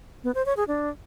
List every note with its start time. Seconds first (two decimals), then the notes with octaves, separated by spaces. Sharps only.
0.24 B3
0.35 C5
0.46 C#5
0.57 G#4
0.68 D4